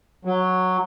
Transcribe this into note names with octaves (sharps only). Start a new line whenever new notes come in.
F#3